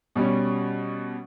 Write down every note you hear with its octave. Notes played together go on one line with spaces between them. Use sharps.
B2 G3 C#4